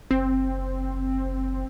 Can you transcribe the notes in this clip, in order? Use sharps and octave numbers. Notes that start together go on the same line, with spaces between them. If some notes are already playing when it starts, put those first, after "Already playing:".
F#1 C4